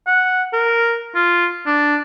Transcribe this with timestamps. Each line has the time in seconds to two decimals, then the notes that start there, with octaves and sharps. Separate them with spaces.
0.07 F#5
0.53 A#4
1.15 F4
1.66 D4